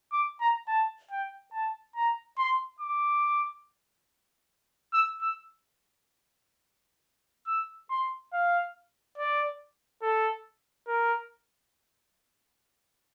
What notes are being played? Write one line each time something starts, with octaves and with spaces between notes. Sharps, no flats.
D6
A#5
A5
G5
A5
A#5
C6
D6
E6
E6
E6
C6
F5
D5
A4
A#4